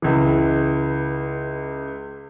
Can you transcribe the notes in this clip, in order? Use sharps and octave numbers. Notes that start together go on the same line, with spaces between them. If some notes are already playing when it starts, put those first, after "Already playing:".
C#2 E3